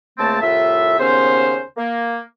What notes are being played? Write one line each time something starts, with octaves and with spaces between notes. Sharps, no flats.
C#2 C#3 A3 A#3 C4 A5
C2 A2 F4 E5
D#2 C#3 B3 C#4 C5
A#3